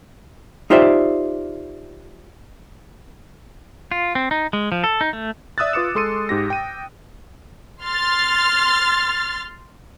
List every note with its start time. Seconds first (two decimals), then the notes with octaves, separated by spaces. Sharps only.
0.70 D#4 F4 G4 C5 D5 E5
3.91 F4
4.15 C4
4.31 D#4
4.53 G#3
4.72 F3
4.84 A4
5.01 D#4
5.13 A3
5.58 D5 E5 D#6 E6 F#6 A6
5.73 F4 B4 D6 C#7 E7
5.95 G#3 A4 C6 C#7 D#7
6.29 G#2 G4 A#6
6.50 G5 D#7
7.83 C6 F6 A6